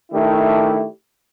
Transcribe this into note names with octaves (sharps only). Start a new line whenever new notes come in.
D#3 A3 D4 E4 G4